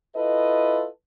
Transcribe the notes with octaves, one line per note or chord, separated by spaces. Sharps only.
E4 F4 A4 B4 D#5